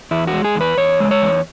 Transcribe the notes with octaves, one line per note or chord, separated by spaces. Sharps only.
E2 E4
F#4
G#3
G#4
E2
B4
E2 C#5
G#3
C#5
E2